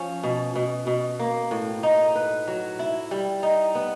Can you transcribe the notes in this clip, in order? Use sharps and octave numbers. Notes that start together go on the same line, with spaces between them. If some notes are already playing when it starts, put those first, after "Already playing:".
Already playing: F3 C#4
B2
B2
B2
A#3
A2
D#4
B4
F#3
E4
G3
D#4
B3